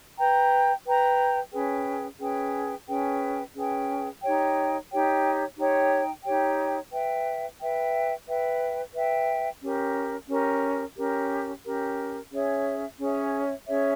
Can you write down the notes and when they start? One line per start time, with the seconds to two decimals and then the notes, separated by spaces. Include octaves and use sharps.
0.18 B4 G5 A#5
0.86 B4 G5 A#5
1.53 C#4 G#4 B4 G5
2.20 C#4 G#4 B4 G5
2.87 C#4 G#4 B4 G5
3.55 C#4 G#4 B4 G5
4.22 D#4 G4 C#5 G5
4.90 D#4 G4 C#5 G5
5.57 D#4 G4 C#5 G5
6.24 D#4 G4 C#5 G5
6.92 B4 E5 G5
7.60 B4 E5 G5
8.27 B4 E5 G5
8.94 B4 E5 G5
9.62 C#4 G4 A#4
10.29 C#4 G4 A#4
10.96 C#4 G4 A#4
11.65 C#4 G4 A#4
12.31 C#4 G#4 C#5 E5
12.99 C#4 G#4 C#5 E5
13.67 C#4 G#4 C#5 E5